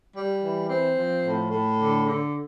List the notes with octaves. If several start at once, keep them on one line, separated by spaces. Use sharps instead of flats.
G3
E3
C4
F3
A2
A2
D3
D3